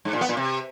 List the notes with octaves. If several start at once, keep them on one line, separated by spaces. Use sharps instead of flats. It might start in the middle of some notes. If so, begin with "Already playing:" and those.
G#2
A#2
B3
A#2
C3